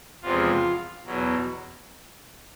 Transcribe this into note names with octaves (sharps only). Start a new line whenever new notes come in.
E2 C3 F3 G#3 F4
E2 B2 F#3